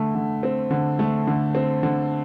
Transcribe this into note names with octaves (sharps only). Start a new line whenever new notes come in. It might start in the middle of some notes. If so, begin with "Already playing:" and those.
Already playing: D3 A3
D3
C4
D3
A3
D3
C4
D3